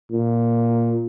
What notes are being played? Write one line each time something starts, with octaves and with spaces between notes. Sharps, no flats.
A#2